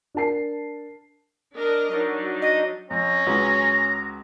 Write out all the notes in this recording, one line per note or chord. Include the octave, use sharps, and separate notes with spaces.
D4 A#4 A5 C7
D4 A#4 D#5
F#3 D4 D#4
D#5
F2 C#4 A#5
C#2 F#3 B4